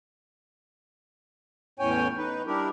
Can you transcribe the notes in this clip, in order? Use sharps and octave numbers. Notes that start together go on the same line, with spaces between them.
E2 A2 C#4 C#5 G5 G#5
D#4 B4
G3 D4 E4 G4 A#4